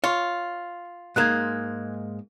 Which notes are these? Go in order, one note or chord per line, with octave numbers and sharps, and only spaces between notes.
F4 C#5
G#2 G#3 A#3 F#6 G#6